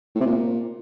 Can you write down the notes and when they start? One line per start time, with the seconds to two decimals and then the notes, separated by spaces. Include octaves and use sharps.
0.15 A2
0.20 C3
0.26 A#2